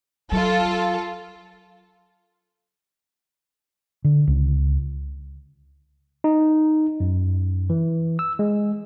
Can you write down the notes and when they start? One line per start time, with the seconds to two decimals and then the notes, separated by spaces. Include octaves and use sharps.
0.32 F#3 F4 A4
4.05 D3
4.28 C#2
6.24 D#4
7.00 F#2
7.70 E3
8.19 E6
8.39 G#3